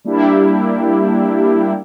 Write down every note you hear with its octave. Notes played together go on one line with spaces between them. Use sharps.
G3 A#3 D4 E4 G4